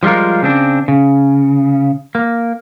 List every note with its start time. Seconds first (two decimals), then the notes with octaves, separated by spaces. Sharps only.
0.03 F3 G3 G#3 F4 A#4
0.42 C#3 C4 D4
0.88 C#3
2.15 A#3